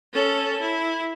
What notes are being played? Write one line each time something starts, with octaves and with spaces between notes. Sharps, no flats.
C#4 A4
E4